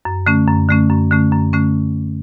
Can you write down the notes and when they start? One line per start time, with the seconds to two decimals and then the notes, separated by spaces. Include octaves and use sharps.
0.05 F#2
0.26 D3 A3 C#4
0.48 F#2
0.69 D3 A3 C#4
0.90 F#2
1.11 D3 A3 C#4
1.32 F#2
1.53 D3 A3 C#4